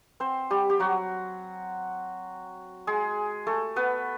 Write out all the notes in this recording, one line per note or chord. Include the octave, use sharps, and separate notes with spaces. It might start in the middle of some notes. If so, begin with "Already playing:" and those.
C4 C5
G3 G4
G4
F#3 F#4
G#3 G#4
A3 A4
B3 B4